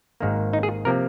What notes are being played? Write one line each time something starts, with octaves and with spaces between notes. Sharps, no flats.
G#1 G#2 D#3 A#3
D#4
G#4
C3 F3 A#3 A#4